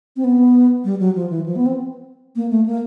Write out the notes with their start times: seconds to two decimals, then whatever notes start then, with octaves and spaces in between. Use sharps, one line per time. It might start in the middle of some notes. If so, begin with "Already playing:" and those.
0.16 C4
0.24 B3
0.84 G3
0.99 F#3
1.15 F3
1.30 E3
1.46 F3
1.56 B3
1.66 C4
2.36 A#3
2.50 A3
2.66 A#3